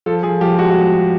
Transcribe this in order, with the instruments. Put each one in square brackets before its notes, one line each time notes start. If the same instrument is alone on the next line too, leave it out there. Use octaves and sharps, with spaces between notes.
[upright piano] F3 A4
F3 G#4
F3 G4
G#3 F#4
F#4